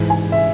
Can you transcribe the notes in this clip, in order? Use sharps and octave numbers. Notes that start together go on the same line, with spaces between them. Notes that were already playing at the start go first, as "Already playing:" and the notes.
Already playing: G#2 E3 G#3
G#5
E5